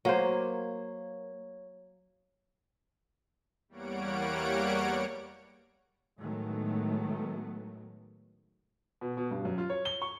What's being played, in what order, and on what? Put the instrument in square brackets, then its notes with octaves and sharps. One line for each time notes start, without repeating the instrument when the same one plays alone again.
[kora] F#3 C5 [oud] A#3 [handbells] C#5
[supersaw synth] E2 G3 A#3 C#5 F#5 D7
[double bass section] A2 D#3 F#3 G#3 A3 B3
[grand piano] B2
B2
G2
F#2
F4
C#5
G7
C#6